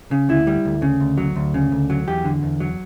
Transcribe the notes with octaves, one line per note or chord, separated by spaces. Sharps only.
C#3
D2 E4
G3
D2
C#3
D2
F#3
D2
C#3
D2
F#3
E2 G4
D3
E2
F#3